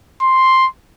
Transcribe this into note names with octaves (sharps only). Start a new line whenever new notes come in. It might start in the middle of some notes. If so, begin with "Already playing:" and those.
C6